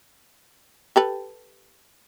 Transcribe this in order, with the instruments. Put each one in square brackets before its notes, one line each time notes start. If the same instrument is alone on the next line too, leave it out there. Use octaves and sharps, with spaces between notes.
[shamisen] G4 A4 B4